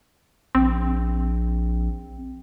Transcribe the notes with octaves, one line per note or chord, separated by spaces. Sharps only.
A#1 C4